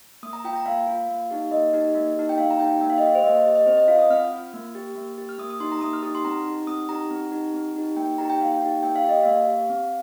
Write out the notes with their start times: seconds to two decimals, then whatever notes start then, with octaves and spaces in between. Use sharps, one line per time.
0.23 A#3 D#6
0.33 A#5
0.45 F4 G5
0.55 A#5
0.66 A#3 F5
0.87 F4
1.09 A#3
1.31 D#4 G4
1.51 A#3 D#5
1.74 D#4 G4
1.95 A#3
2.16 D#4 G4
2.29 G5
2.38 A#3 F5
2.50 A#5
2.59 D#4 G4 G5
2.80 A#3 G5
2.90 F5
2.98 D#5
3.02 G4 F5
3.15 C5
3.24 A#3 D#5
3.35 D#5
3.45 G4 D#5
3.56 D#5
3.66 C4 C5
3.77 D#5
3.88 F4 F5
3.99 D#6
4.11 C4 F6
4.25 F6
4.32 F4
4.54 A#3
4.75 G4
4.95 A#3
5.18 G4
5.29 F6
5.38 A#3 D#6
5.50 D#6
5.60 D#4 G4 C6
5.72 A#5
5.81 A#3 D#6
5.93 F6
6.03 D#4 G4 D#6
6.15 C6
6.24 C4 A#5
6.47 D#4 G4
6.67 C4 D#6
6.89 D#4 G4 A#5
7.11 C4
7.32 D#4 G4
7.54 C4
7.76 D#4 G4
7.96 A#3 G5
8.18 D#4 G4 A#5
8.30 G5
8.40 A#3 F5
8.52 G5
8.62 D#4 G4
8.83 A#3 G5
8.96 F5
9.04 G4 D#5
9.23 A#3 F5
9.48 G4
9.69 C4